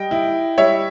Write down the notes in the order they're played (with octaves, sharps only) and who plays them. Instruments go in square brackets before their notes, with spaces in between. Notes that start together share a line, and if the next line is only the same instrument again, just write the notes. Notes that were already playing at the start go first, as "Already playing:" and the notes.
Already playing: [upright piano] G3 [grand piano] D#5 G5
[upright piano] E4
[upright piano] G3 [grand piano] C#5 E5